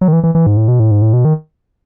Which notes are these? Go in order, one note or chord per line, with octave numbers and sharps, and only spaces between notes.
F#3
D#3
E3
E3
E3
G#2
A2
B2
A2
G#2
A2
B2
D#3